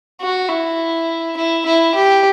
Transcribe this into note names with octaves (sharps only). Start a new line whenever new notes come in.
F#4
E4
E4
E4
G4